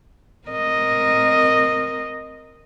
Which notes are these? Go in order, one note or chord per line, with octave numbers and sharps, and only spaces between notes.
C4 A#4 D#5